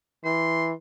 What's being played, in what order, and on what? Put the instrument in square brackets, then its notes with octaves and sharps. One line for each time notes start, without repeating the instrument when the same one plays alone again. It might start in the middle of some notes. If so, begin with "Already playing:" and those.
[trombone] E3 [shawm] C6